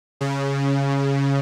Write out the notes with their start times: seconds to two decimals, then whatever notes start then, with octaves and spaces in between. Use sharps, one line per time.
0.21 C#3